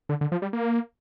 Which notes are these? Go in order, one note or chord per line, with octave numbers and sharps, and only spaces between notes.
D3
D3
F3
G3
A#3